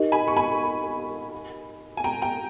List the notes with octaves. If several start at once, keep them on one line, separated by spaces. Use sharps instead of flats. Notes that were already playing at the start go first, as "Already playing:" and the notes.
Already playing: D#4 G4 A#4 D#5
G#5 B5
C#6
G#5 B5
G#5
G5 A#5
G5 A#5